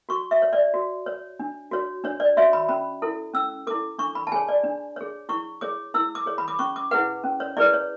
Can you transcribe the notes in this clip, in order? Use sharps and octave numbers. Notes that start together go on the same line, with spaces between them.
F#4 C#6
E5
C#5
D5
F#4
C#5
D4
F#4 C#5
D4 C#5
D5
F#4 C#5 E5
B5
C#4 B5
E4 A4
C#4 E6
E4 A4 D6
D4 C#6
B5
A5
G#4 C#5 G#5
D5
D4
G#4 C#5
E4 C#6
G#4 C#5 D6
E4 E6
D6
G#4 C#5
B5
D6
C#4 C#6
D6
E4 G#4 B4 F#5
C#4
C#5
E4 G#4 B4 D5
C#5